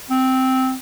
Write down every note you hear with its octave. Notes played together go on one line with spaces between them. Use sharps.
C4